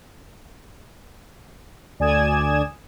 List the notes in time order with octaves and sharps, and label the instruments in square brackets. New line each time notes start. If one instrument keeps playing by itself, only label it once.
[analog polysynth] D2 D5 G#5 D#6 G#6 E7